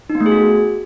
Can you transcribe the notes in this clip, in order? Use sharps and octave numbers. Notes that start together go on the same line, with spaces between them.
D#4
B3
A3
G#4
F#4